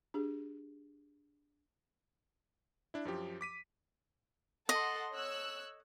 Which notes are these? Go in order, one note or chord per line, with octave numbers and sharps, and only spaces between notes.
D4 G4 G#4
D4 E4
F#2 F3 G4
D6 B6 D#7
A4 D#5 F#5 C6
C#5 E6 F#6